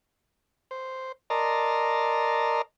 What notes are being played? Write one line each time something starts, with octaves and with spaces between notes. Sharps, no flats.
C5
A#4 D5 D#5 A5 A#5 C6